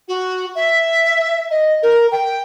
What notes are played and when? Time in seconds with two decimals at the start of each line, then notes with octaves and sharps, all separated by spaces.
0.08 F#4
0.55 E5
1.51 D#5
1.83 A#4
2.12 G5